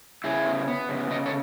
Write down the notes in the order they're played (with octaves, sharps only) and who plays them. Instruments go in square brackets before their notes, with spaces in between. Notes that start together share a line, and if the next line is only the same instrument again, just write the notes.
[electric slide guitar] C#3 E4 G#4
B3
B3
C#3
C#3 B4 D#5
A4 C#5